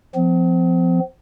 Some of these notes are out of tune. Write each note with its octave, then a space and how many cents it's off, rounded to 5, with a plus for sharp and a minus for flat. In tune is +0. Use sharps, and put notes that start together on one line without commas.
F3 +0 C4 -45